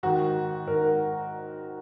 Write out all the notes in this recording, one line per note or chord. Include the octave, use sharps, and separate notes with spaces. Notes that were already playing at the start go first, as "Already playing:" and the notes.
G#2 D#3 F#4
G#2 D#3 A#4